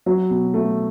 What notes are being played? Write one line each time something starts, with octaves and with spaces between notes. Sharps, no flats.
F#3
B2
A3